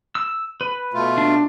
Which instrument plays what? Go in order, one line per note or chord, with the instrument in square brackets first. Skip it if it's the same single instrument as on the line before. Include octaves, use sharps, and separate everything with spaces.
[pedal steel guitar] E6
B4
[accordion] B2 A3 F4
[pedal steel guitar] D4